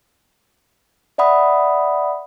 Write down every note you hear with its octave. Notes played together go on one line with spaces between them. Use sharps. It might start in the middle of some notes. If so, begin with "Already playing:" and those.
D5 E5 F#5 B5 D#6